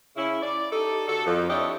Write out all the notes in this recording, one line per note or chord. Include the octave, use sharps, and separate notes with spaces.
C#3 C#4 E4
D5
D#4 G4 A4
D3 F#4 A4
F2
D4 E4 G4 C#5 D#5